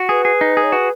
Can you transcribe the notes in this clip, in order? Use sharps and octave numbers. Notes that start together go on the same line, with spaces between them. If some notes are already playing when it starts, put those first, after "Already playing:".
Already playing: F#4
G#4 B4
G#4
D#4
G#4
C#5
F#4 B4